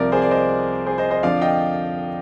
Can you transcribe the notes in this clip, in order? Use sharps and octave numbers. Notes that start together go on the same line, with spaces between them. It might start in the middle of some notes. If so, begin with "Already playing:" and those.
Already playing: C2 C3 F3 A#4 D5
G#4 C5
D5
C5 D#5
G#4 C5
C5 D#5
C5 D#5
F2 D3 F3 D5 F5
D#5 G5